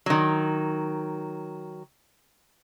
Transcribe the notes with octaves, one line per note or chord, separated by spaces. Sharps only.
D#3 F#3